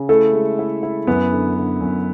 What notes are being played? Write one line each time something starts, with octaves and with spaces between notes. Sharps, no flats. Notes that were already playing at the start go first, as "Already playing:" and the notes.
Already playing: C#3
A3 E4 A4
G#3
E4
E4
F#2 B3 B4
D3
D3
F#2